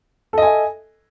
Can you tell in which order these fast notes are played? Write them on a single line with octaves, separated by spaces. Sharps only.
A4 D#5 G#5 E5